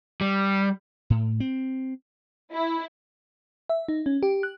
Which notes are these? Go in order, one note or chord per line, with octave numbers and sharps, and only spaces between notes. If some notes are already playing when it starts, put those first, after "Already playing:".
G3
A2
C4
E4
E5
D#4
C#4
G4
F#6